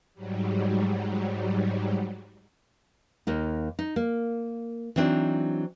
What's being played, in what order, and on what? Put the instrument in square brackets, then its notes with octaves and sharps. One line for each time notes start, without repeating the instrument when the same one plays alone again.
[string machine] G#2 F#3 G3
[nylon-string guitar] D#2 A#3 D#4
D#4
A#3
E3 F#3 C4 D4 D#4